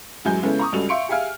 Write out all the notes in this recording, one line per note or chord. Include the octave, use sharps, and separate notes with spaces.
A1 F#2 F#3 G#3 G#5 G6
C#3 G#3 B3 C#4 E4 A4
A#5 C#6 D#6
C#2 G2 C#4 F#4 A4 F7
E5 F5 C6 C#6 C#7 D7
G4 G#4 E5 F5 G#5 F6